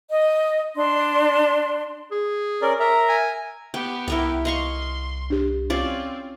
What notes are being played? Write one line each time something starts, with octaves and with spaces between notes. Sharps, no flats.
D#5
D4 C6
G#4
C#4 A#4 D5
A#4 E5 A#5
G#5
B3 G4 G5
C2 E4 A#4 G5
D#5 F5 C6 C#6
D4 G4
C4 C#4 F4 D5